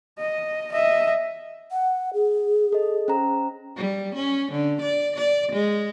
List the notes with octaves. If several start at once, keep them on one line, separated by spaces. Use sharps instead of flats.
D#5
D#5 E5
F#5
G#4
A4 D#5
C#4 C5 A#5
G3
C#4
D3
D5
D5
G#3